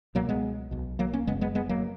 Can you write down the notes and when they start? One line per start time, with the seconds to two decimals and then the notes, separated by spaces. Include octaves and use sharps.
0.15 C#2 B2 F#3 A#3
0.29 G#3 B3
0.71 B1 B2
0.99 F#3 A#3
1.13 A#3 C#4
1.27 F#1 F#2 C#3 G#3 B3
1.41 G#3 B3
1.55 G#3 B3
1.69 F#3 A#3